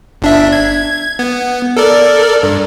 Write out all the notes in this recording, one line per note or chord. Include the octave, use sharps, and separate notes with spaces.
G1 D4 E5
G#6
B3
A4 A#4 D5
G2